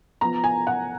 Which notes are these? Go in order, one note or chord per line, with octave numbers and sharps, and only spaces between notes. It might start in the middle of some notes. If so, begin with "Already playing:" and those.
F3 B3 A#5
G#5
F#5